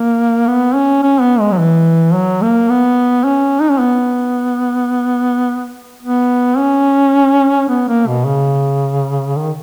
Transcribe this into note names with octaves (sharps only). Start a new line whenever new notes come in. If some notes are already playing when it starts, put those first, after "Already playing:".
Already playing: A#3
B3
C#4
C#4
B3
G#3
F#3
E3
F#3
A#3
B3
C#4
D#4
C#4
B3
B3
C#4
B3
A#3
B2
C#3
D#3